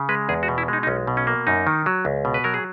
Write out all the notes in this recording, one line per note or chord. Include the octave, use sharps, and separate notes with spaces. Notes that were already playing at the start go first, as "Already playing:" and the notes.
Already playing: C#3
G#3 B4
E2 G#4
F#4
B2
E4
G#3 D#4
D#4
B1 C#4
B2
C#4
A#3
F#2 D#4
D#3
F#3
C#2
B2
B4
F#3 A#4
G#4